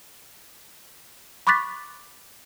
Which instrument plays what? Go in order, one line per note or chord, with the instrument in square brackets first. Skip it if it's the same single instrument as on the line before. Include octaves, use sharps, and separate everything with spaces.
[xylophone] B5 C#6 D6 F#6 A6 B6